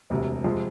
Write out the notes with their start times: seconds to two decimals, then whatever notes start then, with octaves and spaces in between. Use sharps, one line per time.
0.10 E1 D2 C3
0.44 F2 C3 F3 G#3